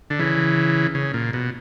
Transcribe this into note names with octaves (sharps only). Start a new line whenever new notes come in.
D3
C#3 E3
C#3
A#2
B2